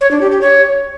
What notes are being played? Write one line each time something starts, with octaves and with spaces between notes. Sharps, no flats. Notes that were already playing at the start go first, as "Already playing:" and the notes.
C#5
D4
G4
G4
C#5